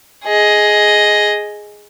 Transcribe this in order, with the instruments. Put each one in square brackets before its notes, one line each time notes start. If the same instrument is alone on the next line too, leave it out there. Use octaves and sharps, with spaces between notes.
[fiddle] G#4 D#5